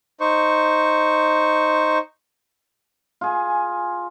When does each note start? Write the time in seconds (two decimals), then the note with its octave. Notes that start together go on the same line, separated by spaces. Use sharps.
0.21 D#4 C5 C#6
3.21 F4 G#4 G#5